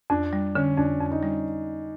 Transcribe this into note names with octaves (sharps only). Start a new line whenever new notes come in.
F2 D4
G3
D3 C#4
F2 D4
F2
D#4
G3